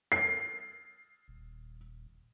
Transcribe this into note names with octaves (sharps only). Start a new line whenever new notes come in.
C7
D#1